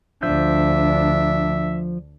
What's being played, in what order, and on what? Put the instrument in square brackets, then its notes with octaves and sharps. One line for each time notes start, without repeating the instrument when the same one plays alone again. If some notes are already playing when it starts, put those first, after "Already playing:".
[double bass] D2 D4 [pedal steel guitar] F3 G6 [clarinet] E5